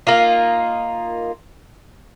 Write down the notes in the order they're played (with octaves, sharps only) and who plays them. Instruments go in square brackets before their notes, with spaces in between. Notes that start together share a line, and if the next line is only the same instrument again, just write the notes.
[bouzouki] A#3 D#4 F4